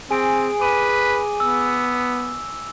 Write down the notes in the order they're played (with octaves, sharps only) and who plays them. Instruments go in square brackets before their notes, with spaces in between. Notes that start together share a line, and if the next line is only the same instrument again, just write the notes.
[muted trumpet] C4 [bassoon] G#4 [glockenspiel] G#5 D7
[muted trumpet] B4 [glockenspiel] D6 D#7
[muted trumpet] B3 [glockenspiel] E6